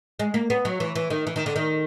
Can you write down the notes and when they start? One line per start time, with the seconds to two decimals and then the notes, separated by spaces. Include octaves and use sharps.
0.19 G#3
0.34 A#3
0.50 B3
0.65 F#3
0.80 E3
0.95 E3
1.10 D#3
1.27 E3
1.36 D#3
1.46 D3
1.56 D#3